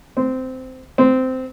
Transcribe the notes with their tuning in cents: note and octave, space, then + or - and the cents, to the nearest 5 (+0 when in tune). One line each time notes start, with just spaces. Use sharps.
C4 -15
C4 -15